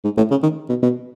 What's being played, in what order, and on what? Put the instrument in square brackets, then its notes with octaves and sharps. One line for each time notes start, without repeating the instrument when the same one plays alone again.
[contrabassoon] G#2
A2
C#3
D#3
B2
B2